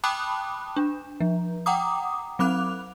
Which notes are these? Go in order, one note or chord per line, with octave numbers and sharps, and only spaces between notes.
G5 A5 B5 D6 D#6 F#6
D4
F3
F#5 G5 A#5 D6 D#6
F#3 C4 D6 F#6 F7